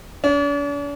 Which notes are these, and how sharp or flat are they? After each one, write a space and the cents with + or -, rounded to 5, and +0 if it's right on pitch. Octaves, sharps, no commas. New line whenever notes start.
D4 -45